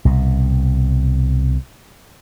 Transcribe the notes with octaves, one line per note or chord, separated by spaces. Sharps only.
C2 B2